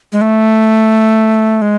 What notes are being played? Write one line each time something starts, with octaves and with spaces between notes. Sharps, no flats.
G#3
A3
G#3